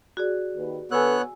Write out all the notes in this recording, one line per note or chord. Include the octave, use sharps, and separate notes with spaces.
F#4 G#4 D5
D#2 B4
D3 B3 A4 B4 C#5 G#5 E6 F#6